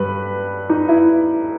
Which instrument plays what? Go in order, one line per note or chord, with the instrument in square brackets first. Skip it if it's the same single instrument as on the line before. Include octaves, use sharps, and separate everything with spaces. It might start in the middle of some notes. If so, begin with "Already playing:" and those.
Already playing: [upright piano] G2 B4
D#4
E4